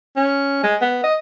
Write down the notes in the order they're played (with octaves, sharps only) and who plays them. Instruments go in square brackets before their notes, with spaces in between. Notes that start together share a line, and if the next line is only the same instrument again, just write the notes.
[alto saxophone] C#4
G#3
B3
D#5